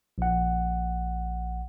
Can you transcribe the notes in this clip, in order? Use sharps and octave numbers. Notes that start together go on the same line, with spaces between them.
A#1 F#5